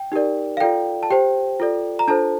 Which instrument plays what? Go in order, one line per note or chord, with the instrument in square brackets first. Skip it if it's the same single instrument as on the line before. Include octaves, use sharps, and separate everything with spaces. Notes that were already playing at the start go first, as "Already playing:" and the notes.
Already playing: [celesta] G5
D#4 G4 A#4 D5
F5
F4 A4 D5 G5
A5
G4 C5 G5
F4 A4 D5
A#5
D4 F4 A4 C5 A5